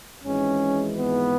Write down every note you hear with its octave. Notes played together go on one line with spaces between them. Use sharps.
G#1 G#2 E3 G#3 C#4
B3